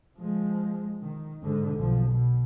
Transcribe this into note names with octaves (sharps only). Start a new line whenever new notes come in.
F3 G#3
D#3
G#2 D3
B1 F3
B2